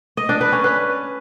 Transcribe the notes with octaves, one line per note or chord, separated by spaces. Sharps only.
D#5
D4
B4
C#4
B4